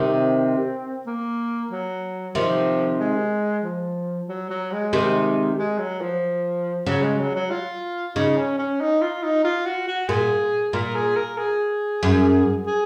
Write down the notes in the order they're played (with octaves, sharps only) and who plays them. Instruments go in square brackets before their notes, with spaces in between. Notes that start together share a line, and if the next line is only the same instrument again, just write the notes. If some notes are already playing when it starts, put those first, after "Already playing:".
Already playing: [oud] C3 D#3
[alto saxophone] C4
A#3
F#3
[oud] C3 D#3 [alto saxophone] F3
[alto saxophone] G#3
F3
F#3
F#3
G#3
[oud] C3 D#3
[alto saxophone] G#3
F#3
F3
[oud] C#3 [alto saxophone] F#3
[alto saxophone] G#3
F#3
F#3
F4
[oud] C#3 [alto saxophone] D#4
[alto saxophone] C#4
C#4
D#4
F4
D#4
F4
F#4
F#4
[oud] A#2 [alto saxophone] G#4
[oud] A#2 [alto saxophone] A#4
[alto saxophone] G#4
A#4
G#4
[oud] F#2
[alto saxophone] G#4